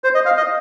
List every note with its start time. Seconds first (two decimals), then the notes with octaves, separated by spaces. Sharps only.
0.04 C5
0.15 D#5
0.25 F5
0.37 D#5